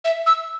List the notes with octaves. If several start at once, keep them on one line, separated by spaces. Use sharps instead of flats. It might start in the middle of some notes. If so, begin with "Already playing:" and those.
E5
E6